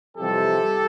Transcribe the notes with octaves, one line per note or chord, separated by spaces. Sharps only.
F2 C3 E3 G3 G4 A4